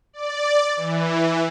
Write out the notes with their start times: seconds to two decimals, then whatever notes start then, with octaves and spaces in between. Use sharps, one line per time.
0.13 D5
0.76 E3